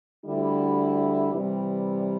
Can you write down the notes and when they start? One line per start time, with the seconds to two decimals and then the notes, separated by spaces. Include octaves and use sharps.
0.24 D2 D3 G3 E4
1.33 C3 E3 G3